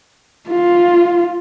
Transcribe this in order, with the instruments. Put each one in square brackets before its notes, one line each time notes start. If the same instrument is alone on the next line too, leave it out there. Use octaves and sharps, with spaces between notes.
[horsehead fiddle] F4